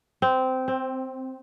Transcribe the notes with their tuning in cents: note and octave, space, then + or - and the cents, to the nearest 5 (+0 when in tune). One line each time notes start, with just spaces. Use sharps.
C4 -15
C4 +10